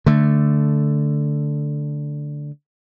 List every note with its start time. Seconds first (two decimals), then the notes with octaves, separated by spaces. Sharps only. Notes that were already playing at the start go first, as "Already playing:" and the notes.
0.06 D3 A3